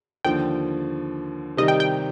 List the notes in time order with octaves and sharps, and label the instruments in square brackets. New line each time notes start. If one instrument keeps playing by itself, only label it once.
[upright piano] D#2 D3 F3 [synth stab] G5
[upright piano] C3 D#3 G3 [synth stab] D#5
[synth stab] G5
G5